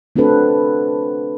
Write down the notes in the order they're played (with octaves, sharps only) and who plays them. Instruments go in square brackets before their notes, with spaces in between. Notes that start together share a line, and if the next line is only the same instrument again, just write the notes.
[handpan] A3 C4 D4 F#4 A4 B4